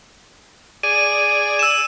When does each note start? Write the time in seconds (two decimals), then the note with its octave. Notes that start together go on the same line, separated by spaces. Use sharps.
0.83 G#4 D5 D#7
1.59 E6 E7